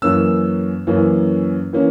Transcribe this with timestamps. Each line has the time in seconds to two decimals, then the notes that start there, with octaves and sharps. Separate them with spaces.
0.02 F#2 E3 A#3 C#4 E6
0.87 F#2 E3 A#3 C#4
1.73 E3 A#3 C#4